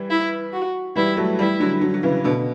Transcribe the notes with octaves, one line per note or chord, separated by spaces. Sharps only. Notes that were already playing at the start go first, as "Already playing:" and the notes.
Already playing: E3 G3
E4
F#4
E3 G3 E4
F#3 A3
E3 G3 E4
D3 F#3
D3 F#3
F#3
C#3 E3
B2 D3